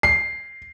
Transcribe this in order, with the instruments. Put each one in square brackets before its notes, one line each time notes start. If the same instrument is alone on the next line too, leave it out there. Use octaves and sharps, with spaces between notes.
[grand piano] C7